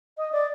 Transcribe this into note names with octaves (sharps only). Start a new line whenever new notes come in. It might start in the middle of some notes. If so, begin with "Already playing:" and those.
D#5
D5